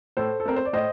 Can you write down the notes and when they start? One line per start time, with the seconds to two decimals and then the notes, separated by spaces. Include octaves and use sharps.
0.17 A2 A4 C5
0.40 A4
0.46 A3 C4 A#4
0.56 C5
0.65 D5
0.73 A2 C5 D#5